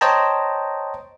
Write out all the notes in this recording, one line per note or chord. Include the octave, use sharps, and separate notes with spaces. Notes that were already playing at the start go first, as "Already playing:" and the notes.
C5 C#5 D#5 G5 A5 A#5